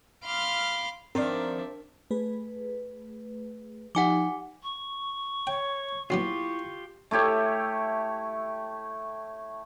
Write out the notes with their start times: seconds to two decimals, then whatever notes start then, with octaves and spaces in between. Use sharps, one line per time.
0.25 F5 B5 C6 D6 F6
1.15 D#3 F3 C4 D4 F4 A#4 D5 E5
2.11 A3 G#4 B4
3.95 F3 D#4 G4 F#5 G#5 D6
4.63 C#6
5.47 C#5 G5
6.10 A#1 F#3 B3 E4 F4 G4 C#6
7.11 A3 E4 G4 C#5